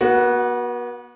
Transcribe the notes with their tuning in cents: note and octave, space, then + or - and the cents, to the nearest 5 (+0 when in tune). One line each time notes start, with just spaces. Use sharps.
B3 -40 F#4 +0